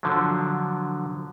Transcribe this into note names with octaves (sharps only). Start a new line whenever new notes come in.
D3 F3 F#3